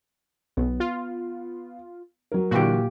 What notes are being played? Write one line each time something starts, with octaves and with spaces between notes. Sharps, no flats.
B1 B3
F4
F#3 A#4
A#2 D3 E3 F#4 G4